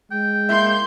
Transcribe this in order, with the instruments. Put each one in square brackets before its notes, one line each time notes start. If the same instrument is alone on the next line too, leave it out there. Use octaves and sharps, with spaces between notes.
[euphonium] G#3 [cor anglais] G5
[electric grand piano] A#3 E4 E5 [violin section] C6 G6